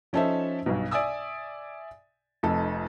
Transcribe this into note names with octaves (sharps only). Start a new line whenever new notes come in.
F3 C#4 D#4 A4 C5 E5
B1 G2 B2
D5 E5 G#5 D#6 E6
F1 F2 D#4 A4